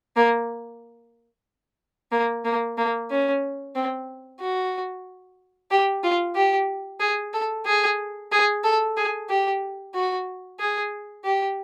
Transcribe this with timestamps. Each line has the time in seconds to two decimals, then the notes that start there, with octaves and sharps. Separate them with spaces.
0.16 A#3
2.12 A#3
2.45 A#3
2.78 A#3
3.10 C#4
3.75 C4
4.41 F#4
5.71 G4
6.04 F4
6.35 G4
7.00 G#4
7.33 A4
7.66 G#4
8.32 G#4
8.64 A4
8.97 G#4
9.29 G4
9.95 F#4
10.60 G#4
11.25 G4